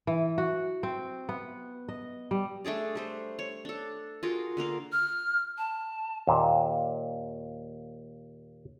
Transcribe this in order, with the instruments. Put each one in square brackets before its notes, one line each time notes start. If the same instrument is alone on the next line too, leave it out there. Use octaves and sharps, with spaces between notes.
[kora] E3
F#4
C4
B3
D#5
G3
[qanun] A3 D4 G#4 D5
G3 A3 C5
C#5
D4 A4
F4 F#4 G#4 A#4
D3 A#3 A#4 F5
[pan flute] F6
A5
[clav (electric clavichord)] D#2 A#2